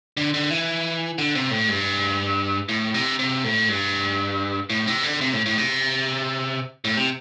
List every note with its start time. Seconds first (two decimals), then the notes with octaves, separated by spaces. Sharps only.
0.17 D3
0.34 D3
0.50 E3
1.18 D3
1.35 C3
1.51 A2
1.69 G2
2.69 A2
2.94 C3
3.19 C3
3.44 A2
3.69 G2
4.70 A2
4.87 C3
5.03 D3
5.21 C3
5.33 A2
5.46 A2
5.58 C3
6.85 A2
6.97 C3